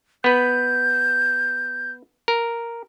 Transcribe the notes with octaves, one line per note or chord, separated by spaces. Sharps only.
B3 B4 G6
A#4